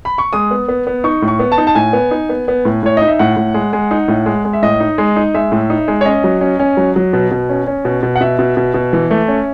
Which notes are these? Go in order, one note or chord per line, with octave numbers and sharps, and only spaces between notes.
B5
C#6
G#3 D#6
B3
B3
B3
D#4 C#6
A2
C#6
B3
A5
D#4
A5
A2 G#5
B3
D#4
B3
B3
A2
A2 C#5
D#4 D#5
E5
A2 F#5
A2
G#3
G#3
D#4
A2
G#3
G#3
E5
A2 D#5
D#4
G#3
D#4
G#3 E5
A2
D#4
G#3
C#5
C#4 D#5
F#3
C#4
C#4
F#3
F#3
B2
B2
C#4
C#4
B2
B2
F#5
B2 E5
B2
B2
B2
E3
A3
C#4